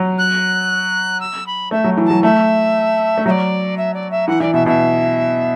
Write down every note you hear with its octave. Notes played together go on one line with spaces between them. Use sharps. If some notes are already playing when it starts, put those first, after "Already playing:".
Already playing: F#3
F#6
E6
B5
A3 E5
F#3
E3
F#3 A5
A3 E5
A3
F#3 D5 E5
E5
D5
E5
E3 F#5
E3 D5
B2 E5
B2 E5